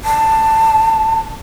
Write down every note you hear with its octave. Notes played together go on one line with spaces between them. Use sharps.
A5